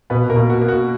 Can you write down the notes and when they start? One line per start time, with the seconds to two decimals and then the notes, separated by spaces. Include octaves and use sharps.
0.10 B2 B3 B4
0.30 A#3 A#4
0.36 B2
0.50 F#4
0.62 A#3
0.68 F#4